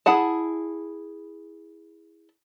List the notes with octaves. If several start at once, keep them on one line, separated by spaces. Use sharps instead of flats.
E4 G#4 F#5 A5